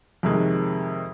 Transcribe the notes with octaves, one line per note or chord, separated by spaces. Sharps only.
F2 C3 D#3 G#3